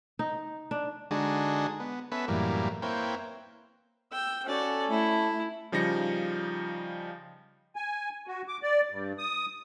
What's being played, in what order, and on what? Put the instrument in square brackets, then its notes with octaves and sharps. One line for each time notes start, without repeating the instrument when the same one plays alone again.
[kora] D#4
D4
[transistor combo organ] D3 G#3 D4 D#4 F#4 G#4
B3
B3 C#4 A4 B4 E5
F#2 A2 E3 G3 A#3
A#3 C4 E4 B4 C#5 G5
[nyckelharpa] G5 [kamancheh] E6
[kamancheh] C#4 A4 [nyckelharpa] F#4 D5
[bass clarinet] A3 [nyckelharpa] E4
[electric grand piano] C#3 F3 G3 D#4 A#6 C#7
[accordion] G#5
F#4
D6
D5
G2
D#6